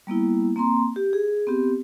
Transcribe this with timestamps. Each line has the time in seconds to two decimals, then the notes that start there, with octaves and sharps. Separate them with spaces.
0.07 G3 A#3 B3 E4
0.56 A#3 C4 A#5 C6
0.96 G4
1.13 G#4
1.47 B3 C4 G4